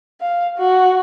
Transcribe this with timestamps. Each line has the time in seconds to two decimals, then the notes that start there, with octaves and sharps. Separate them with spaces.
0.21 F5
0.58 F#4